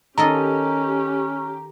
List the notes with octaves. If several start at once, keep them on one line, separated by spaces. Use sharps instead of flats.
D#3 C#4 G4 A4 D#5 A#5